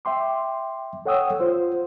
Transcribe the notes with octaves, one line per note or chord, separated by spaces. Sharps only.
E5 G5 C6 D6
A4 C#5 F#5 G5 D#6 E6
F4 C5